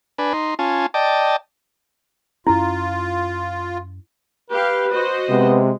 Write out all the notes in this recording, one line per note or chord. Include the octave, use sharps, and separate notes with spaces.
D4 B4 G#5
D#4 C6
C#4 F4 G#5 A5
D5 D#5 G5 A5
F#2 C#4 E4 F4
G4 B4 F5
F#4 C5 D#5
C3 G#3 B3